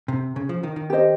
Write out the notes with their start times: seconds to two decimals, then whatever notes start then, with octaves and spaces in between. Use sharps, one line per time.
0.08 C3
0.36 C#3
0.49 F3
0.63 D#3
0.76 D#3
0.90 G4 C5 D#5